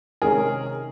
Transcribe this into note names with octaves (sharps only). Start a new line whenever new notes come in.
C3 D#3 G#3 C#4 G#4 A#4